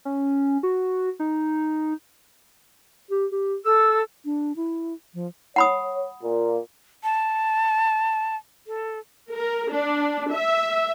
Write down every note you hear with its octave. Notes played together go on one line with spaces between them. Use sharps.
C#4
F#4
D#4
G4
G4
A4 E6
D4
E4
F3
C#5 F#5 B5 D#6
A#2
A5
A4
A#4
D4
E5